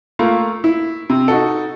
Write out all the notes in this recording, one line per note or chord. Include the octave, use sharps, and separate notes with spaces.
A3 A#3 F4
E4
C3
D#4 F#4 A4